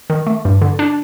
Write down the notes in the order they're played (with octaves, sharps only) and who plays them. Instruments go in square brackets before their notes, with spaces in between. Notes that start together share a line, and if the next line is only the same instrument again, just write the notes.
[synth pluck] D#3
A3
G2
D3
D4